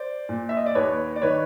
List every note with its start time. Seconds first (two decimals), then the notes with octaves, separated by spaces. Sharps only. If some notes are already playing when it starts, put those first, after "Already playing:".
Already playing: C5 D5
0.29 A#2
0.49 E5
0.57 D#5
0.66 D5
0.75 D#2 B4 C#5
1.16 D5
1.22 D#3 B4 C#5